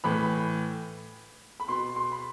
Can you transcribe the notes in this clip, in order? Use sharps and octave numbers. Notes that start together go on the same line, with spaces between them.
A2 E3 B5
B5
B2 C6
C6
B5